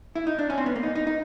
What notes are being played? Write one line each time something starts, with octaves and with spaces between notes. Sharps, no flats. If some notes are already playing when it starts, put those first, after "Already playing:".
E4
D#4
D4
C#4
C4
B3
A#3
D#4
D#4
D#4